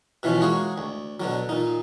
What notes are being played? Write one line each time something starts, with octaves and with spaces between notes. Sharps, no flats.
B2 E3 F3 C#4
G#3 A#3 F#4 G#4 C#5
D2
B2 D3 F#3
A#2 D#4